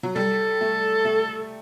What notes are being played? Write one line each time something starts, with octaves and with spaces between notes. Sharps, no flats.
F#3
G3 A4
A3
A3